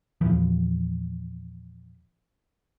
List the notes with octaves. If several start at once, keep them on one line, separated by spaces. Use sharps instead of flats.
E2 A#2 E3 F3